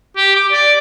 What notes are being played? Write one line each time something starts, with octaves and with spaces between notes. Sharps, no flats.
G4
D6
D5